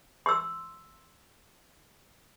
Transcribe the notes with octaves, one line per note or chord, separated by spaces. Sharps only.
C6 E6